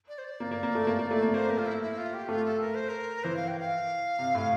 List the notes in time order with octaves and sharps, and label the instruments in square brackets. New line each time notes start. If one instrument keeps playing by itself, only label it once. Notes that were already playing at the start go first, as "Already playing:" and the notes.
[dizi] D5
C5
D5
[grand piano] A#3
A#3
A#3
A3
A#3
A#3
A3
A#3
[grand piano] A#3 [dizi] C5
[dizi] A#4
F4
E4
E4
F4
G4
[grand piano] A3 [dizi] F4
[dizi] A4
A#4
C5
A#4
[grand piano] E3 [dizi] C5
[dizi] F5
G5
F5
[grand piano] C3
A2